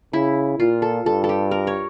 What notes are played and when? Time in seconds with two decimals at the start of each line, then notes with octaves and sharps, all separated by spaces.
0.13 C#3 E4
0.59 A#2 F4
0.82 A4
1.06 G2 A4
1.24 A4
1.29 G4
1.51 A#4
1.67 C#5